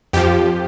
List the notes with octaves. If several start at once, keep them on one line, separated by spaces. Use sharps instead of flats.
F2 F3 G4